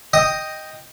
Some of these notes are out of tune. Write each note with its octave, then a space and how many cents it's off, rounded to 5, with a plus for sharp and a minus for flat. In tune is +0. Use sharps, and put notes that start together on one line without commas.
D#5 +0 G5 +0 D#6 +0